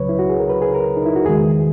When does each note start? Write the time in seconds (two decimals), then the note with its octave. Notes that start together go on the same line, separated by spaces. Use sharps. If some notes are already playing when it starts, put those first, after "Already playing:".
Already playing: C#2 C#3 F#3 B4 C#5
0.09 E4
0.19 F#4
0.29 G#4
0.39 A#4
0.49 B4
0.62 G#4
0.74 A#4
0.97 D#4
1.06 E4
1.16 F#4
1.26 E2 D#3 G#3 G#4